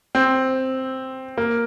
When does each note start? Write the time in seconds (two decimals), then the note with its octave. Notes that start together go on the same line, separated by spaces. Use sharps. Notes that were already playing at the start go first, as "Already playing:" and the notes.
0.15 C4
1.38 A#3